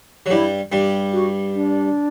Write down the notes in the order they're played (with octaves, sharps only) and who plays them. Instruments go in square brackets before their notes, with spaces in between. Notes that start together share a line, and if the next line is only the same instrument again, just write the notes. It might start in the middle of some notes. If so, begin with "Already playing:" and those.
[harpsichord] F#3
[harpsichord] G2 G3 [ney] E4
[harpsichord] G2 G3 [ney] G4
[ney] F#4
D4